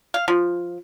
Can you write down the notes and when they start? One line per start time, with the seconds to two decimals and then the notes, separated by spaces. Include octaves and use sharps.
0.14 F5
0.28 F3